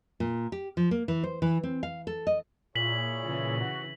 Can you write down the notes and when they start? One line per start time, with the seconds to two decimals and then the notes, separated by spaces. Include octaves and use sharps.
0.20 A#2
0.52 G4
0.77 F3
0.91 A#3
1.08 E3
1.24 C5
1.42 E3
1.63 C4
1.83 F5
2.07 A4
2.27 D#5
2.75 A#2 E4 G#4 C#5 B6 F#7
3.24 C#3 E3
3.59 F#4